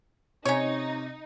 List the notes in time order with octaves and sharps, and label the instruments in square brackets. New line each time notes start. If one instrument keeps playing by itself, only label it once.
[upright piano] C3 [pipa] C#4 C#5 [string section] D#4